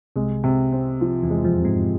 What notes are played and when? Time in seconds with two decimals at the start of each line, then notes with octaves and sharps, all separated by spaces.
0.16 C2 C3 G#3
0.44 C3
0.72 C4
1.01 F3
1.23 E2 E3
1.30 G#3
1.44 F2 F3
1.58 C3
1.65 G#2 G#3